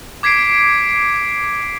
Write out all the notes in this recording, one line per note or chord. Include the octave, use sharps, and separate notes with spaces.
D6 G#6 B6 C7 D7